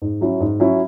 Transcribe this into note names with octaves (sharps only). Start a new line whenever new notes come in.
G#2
F#3 C#4 E4
G#2
F#3 C#4 E4